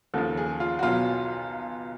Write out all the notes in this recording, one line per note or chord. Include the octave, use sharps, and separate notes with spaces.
D#2 C#3 F3 A4
G#4
F4
F#4
B1 B2 F#3 F4